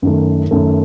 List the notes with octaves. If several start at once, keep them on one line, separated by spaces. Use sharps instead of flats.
F#2 D#3 A3
F#2 D#3 A3